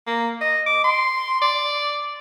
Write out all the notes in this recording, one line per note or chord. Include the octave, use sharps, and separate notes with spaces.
A#3
D#5
D6
C6
D5